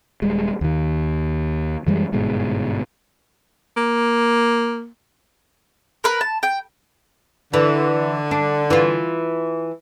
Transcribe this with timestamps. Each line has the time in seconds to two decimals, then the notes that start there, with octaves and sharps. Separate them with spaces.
0.22 D#1 G3 G#3
0.61 D#2 D#3
1.87 F#2 E3 G3 G#3
2.12 G1 G#2 B2 G#3
3.77 A#3
6.04 A#4 B4
6.21 A5
6.43 G5
7.54 D3 E3
8.31 D4
8.70 E3 F4